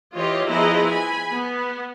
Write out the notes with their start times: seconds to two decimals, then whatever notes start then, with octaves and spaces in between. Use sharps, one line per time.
0.17 E3 F4 G4 C#5 D#5
0.48 F3 B3 E4 G#4 D#5 A#5
0.88 G#5 B5
1.32 B3